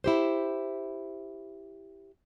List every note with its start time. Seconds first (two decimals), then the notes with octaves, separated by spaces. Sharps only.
0.04 E4 G4 C5